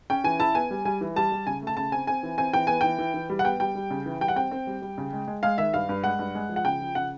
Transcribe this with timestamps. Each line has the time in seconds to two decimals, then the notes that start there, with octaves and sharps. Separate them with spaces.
0.10 C#4 G5
0.24 E3 G#5
0.40 E4 A5
0.55 B3 G#5
0.71 G3
0.85 G3 G#5
1.01 E3
1.16 G3 A5
1.32 G3
1.47 C#3 G#5
1.62 A3 A5
1.77 C#3 A5
1.92 C4 G#5
2.07 C4 G#5
2.23 E3
2.38 C4 G#5
2.53 E3 G5
2.67 B3 G#5
2.81 E3 G5
2.98 E3
3.14 E3
3.30 G3
3.39 F#5
3.44 B3 G5
3.60 G3 G5
3.75 G3
3.91 C#3
4.06 E3
4.21 G3 G5
4.28 F#5
4.36 C4 G5
4.51 C4
4.67 G3
4.82 G3
4.98 C#3
5.13 G#3
5.28 G#3
5.43 G#3 F5
5.58 D#3 E5
5.74 G2 F5
5.89 G2
6.04 G#3 F#5
6.19 G2
6.35 G#3
6.49 F3
6.56 F#5
6.65 C#3 G5
6.80 F3
6.95 C#3 F#5